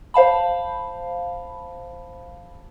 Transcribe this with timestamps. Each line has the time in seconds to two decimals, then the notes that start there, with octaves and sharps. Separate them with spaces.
0.14 C5 F5 A5 B5